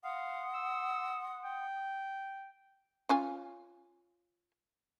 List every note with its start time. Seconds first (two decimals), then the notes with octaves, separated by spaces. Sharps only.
0.04 F5 F#5 C6 D#6
0.54 E6
1.44 G5
3.09 C#4 F4 G#5